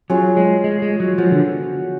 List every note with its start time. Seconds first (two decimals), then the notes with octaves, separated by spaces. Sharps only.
0.10 F#3 C#4 F4 G#4 C#5
0.37 G#3
0.64 G#3
0.82 G#3
1.00 F#3
1.18 F3 B3 F#4 C#5
1.32 D3